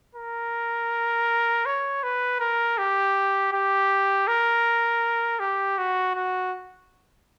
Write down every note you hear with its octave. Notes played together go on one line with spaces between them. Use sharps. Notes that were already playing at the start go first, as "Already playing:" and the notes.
A#4
C#5
B4
A#4
G4
G4
A#4
G4
F#4
F#4